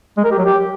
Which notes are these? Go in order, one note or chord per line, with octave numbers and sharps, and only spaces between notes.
G#3
A#4
G4
F#3
G4